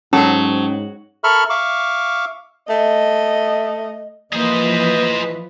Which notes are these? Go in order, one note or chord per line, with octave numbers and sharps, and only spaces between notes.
G#2 F#3 C#4 A4 C5
A4 A#4 E5 B5 C#6 F6
E5 F5 C#6 D6
A3 D#5
E3 F3 A#3 G#4 B4 C5 D#5